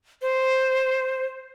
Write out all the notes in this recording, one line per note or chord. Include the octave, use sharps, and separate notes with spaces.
C5